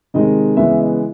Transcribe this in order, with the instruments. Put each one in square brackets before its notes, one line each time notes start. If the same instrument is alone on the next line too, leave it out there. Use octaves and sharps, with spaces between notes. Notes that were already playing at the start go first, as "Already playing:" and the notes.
[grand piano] C3 D#3 G#3 D#5
C#3 E3 G#3 B3 E5
D#5